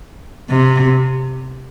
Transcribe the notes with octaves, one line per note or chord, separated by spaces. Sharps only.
C3